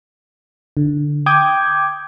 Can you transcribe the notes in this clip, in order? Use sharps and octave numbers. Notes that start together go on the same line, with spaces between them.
D3
G5 D6 D#6 G6 G#6